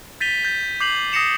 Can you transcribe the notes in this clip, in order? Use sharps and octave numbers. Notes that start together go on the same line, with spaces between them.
G6 A6 B6 D#7 F7 G7
G6 A6
D6 G6 C7 F7 F#7
D#6 A#6 C7 C#7 E7 F7